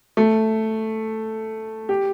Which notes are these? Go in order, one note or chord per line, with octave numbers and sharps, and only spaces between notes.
A3
G4